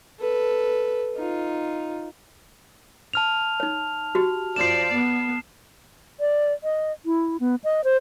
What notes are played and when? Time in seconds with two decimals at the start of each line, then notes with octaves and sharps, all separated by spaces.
0.20 A4 B4
1.15 D#4 F4
3.13 A5 F6 F7
3.60 D#4 C#5
4.15 F#4 G4
4.56 F#2 F3 D5 C7 E7
4.93 B3
6.20 D5
6.64 D#5
7.06 E4
7.40 B3
7.64 D#5
7.84 C5